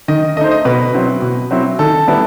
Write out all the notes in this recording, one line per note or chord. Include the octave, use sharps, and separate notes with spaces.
D#3 D#5
A3 D#4 C5 D#5
D#5
B2 B4
F#3 C4 E4
B2
F#3 C4 E4
D#3 A4
G3 B3 E4